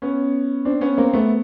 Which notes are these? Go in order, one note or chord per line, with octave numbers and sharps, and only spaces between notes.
B3 C#4
C4 D4
B3 C#4
A#3 C4
A3 B3